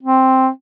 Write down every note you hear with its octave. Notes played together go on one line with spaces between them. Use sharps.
C4